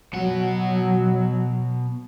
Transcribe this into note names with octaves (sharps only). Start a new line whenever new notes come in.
B2 F#3 F#5